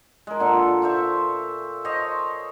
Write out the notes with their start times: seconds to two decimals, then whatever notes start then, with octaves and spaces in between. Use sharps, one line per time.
0.27 G#3 A#4
0.40 A#2 D3 A4
0.82 C5 E5 F5 C#6
1.85 C5 C#5 D#5